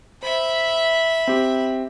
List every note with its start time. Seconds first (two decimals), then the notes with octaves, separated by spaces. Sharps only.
0.23 C5 E5 B5
1.28 C4 G4